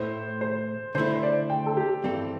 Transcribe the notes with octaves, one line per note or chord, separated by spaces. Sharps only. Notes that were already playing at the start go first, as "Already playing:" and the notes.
Already playing: A2 A3 E4 C5
C5
D3 A3 E4 C5
C5
D5
G5
A4
G4
G2 E3 C4 A4